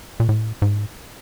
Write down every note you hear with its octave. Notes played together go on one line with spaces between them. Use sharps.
A#2
A2
G#2